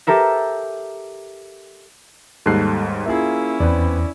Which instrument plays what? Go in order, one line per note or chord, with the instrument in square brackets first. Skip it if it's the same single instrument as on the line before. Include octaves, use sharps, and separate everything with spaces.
[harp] G4 A4 A#4 E5
[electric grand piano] D#2 G#2 G3 [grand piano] A4 F#6 C7
[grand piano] A#3 F4 G#4 [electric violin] C#4 E4 [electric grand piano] E5
[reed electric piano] E2 [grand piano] B3 C4 B4 [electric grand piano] D5